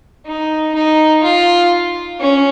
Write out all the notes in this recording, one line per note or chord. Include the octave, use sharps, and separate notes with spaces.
D#4
D#4
F4
C#4